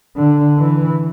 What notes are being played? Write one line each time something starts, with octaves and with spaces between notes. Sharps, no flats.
D3
E3